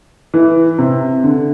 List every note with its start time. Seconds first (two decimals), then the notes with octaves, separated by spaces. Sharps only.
0.34 E3
0.78 C3
1.24 D3